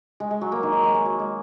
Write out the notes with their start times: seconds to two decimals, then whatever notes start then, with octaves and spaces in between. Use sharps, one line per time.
0.20 G#3
0.31 G#3
0.41 F#3
0.52 A#3
0.63 D#3
0.73 F#3
0.84 G#3
0.95 G#3
1.05 F#3
1.20 G#3